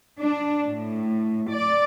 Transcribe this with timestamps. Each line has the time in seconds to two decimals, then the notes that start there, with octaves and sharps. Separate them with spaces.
0.19 D4
0.66 A2
1.49 D5